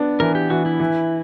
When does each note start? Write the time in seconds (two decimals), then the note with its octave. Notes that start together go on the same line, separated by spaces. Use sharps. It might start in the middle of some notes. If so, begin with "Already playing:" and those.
Already playing: B3 D4
0.20 E3 A#4
0.35 G4
0.50 E3 F#4
0.66 E4
0.80 E3